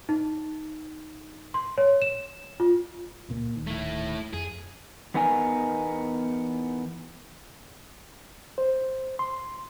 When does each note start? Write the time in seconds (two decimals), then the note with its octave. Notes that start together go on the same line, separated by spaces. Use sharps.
0.09 D#4
1.54 C6
1.78 C#5
2.02 E7
2.60 F4
3.29 C#2 A#2 A#3
3.54 D1 D#3
3.67 A3 E4
4.33 F2 G#4
5.14 E2 B3 D#4 A#4 G#5
8.58 C5
9.19 C6